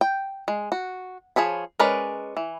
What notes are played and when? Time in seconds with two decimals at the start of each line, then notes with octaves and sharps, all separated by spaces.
0.01 G5
0.48 G#3
0.72 F#4
1.36 F3 G#4 C#5 B5
1.79 G#3 C#4 A#4 B4 D5
2.37 E3